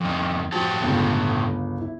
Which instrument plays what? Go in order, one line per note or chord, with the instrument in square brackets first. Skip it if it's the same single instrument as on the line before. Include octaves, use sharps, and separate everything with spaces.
[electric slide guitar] F2 D#3
[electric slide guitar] A2 G4 A5 [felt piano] F3 F#4
[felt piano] G1 C#2
E4